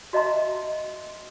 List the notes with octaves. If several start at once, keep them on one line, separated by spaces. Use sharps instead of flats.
F#4 D#5 E5 A#5 C6